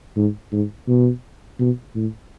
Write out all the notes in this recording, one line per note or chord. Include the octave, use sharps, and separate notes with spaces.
G#2
G#2
B2
B2
A2